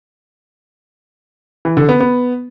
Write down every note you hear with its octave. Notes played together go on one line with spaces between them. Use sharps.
E3
D3
B3
B3